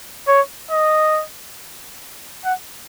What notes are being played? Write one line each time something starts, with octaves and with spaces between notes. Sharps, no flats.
C#5
D#5
F#5